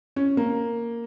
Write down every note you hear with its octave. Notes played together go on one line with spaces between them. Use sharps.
C#4
A#3